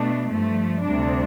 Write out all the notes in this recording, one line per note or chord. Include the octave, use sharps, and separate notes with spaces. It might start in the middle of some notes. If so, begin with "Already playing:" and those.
Already playing: B2 A3 D4
G2 F3 A3
D2 C3 G3 D4